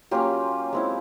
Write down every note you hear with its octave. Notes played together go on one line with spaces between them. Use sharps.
F#3 A#3 C#4 F4 G4
G#3 C4 E4